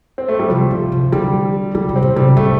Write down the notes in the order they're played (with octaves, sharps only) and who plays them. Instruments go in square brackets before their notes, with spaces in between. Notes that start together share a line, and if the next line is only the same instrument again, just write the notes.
[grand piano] C4
A3
G3
[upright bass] C3 [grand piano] F3
[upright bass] A2
C3
[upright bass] D3 [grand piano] G3
[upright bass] D3 [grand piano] G3
[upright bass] C3
[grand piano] C4
[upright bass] A2
[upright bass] C3 [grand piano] G3
[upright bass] A2 [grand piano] A3